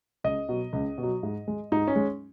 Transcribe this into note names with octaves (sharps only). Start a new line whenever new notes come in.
C#2 D#5
B2 F#3
C#2
B2
F#3
G#2
G#3
G#2 D#4
C#4
G#3